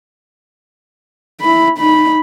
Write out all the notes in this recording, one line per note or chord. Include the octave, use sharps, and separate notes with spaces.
E4 B5
D#4 B5